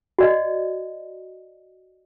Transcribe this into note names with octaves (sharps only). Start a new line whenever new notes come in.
F#4 D5 D#5